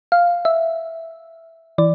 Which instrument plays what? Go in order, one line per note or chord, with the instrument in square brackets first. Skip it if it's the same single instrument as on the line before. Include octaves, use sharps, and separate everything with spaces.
[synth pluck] F5
E5
E3 D5